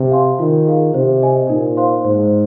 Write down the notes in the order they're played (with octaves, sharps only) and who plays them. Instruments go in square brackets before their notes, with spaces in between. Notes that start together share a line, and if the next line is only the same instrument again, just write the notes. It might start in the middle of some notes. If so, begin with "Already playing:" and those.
Already playing: [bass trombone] C3
[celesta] F5 G#5 C6
[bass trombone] D#3 [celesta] F4
[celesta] G#4 F5
[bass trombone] C3 [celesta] C5
[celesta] D#5 G#5
[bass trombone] A#2 [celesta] D#4
[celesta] C5 F5 C6
[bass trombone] G#2 [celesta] C5